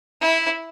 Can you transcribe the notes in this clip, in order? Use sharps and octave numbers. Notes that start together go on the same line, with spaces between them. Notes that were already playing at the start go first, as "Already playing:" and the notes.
E4